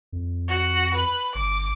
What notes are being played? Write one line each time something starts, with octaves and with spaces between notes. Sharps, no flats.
F2
F#4
B4
G1 D6